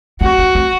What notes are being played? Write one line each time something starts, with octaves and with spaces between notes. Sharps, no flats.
C4 F#4
D4
C4